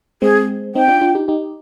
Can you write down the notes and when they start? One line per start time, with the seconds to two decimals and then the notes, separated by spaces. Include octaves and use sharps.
0.22 G#3 C4 G#4
0.75 C4 D#4 G5
0.88 D4 F4
1.01 D4 F4
1.15 D#4 G4
1.28 D#4 G4